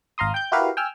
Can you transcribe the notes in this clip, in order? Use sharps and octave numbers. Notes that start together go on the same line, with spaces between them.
G#1 F5 A#5 C6 D#6
G5 G6
E4 F#4 G4 A#4 B4 F5
G5 G#5 E6 F6